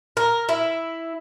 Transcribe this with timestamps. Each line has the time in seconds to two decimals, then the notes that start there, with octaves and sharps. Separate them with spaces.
0.17 A#4
0.49 E4